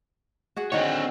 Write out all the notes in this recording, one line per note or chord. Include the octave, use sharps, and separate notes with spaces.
F#4 G#4 F#5
D3 D#3 C4 C#5 F#5